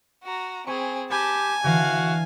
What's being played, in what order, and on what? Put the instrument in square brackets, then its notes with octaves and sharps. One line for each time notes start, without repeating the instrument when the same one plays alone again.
[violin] F#4 A#5
[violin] C4 G#4 [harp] G#5 B5 C#6
[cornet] G4 [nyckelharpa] G#5 [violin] A5 [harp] B5
[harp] D3 E3 [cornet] F#4 [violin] F5